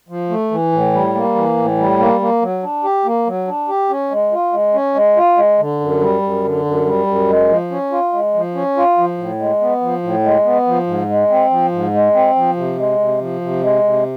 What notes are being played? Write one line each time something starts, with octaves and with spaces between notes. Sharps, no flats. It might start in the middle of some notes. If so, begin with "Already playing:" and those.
F3
A3
E3
A2
G3
A#3
E3
A2
G3
A#3
A#3
F#3
D4
G4
A#3
F#3
D4
G4
C#4
G#3
F4
G#3
C#4
G#3
F4
G#3
D3
F#2
G3
F#2
D3
F#2
G3
F#2
G#3
F3
C#4
F4
G#3
F3
C#4
F4
F3
A2
G#3
B3
F3
A2
G#3
B3
F3
G#2
G#3
C4
F3
G#2
G#3
C4
F3
C3
G#3
C3
F3
C3
G#3
C3